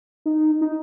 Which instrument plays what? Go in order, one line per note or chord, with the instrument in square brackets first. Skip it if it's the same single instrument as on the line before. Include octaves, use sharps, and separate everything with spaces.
[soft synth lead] D#4
D#4